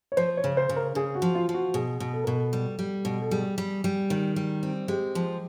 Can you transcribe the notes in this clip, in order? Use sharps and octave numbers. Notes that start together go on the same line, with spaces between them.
C#5
F3 C5
C#5
C#3
C5
C#3
A#4
C#3 G#4
F#4
F3
F4
F3
F#4
B2 G#4
B2
A4
B2 A#4
A4
G3
G3
B2
A4
G3 G#4
G3
G3
D#3
G3
C4
G#3 G4
F3